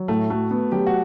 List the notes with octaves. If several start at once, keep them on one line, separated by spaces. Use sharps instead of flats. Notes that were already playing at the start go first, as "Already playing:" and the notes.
Already playing: F#3
A2 A3
A3 F#4
B3
F#3 G4
F#4